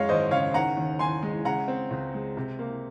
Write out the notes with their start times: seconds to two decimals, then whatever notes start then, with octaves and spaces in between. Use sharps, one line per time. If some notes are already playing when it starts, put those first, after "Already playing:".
Already playing: F#2 G#3 C#5 F5
0.09 G#1 C5 D#5
0.31 C#3 C#5 F5
0.54 D#3 F#5 A#5
0.77 D#2
0.99 D#2 G#5 C6
1.23 G#3
1.45 C#3 F#5 A#5
1.68 C4
1.90 C#2
2.14 G#3
2.37 C3
2.59 A#3